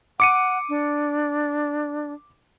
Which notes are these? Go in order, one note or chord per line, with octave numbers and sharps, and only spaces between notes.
F#5 D6 C#7 D#7
D4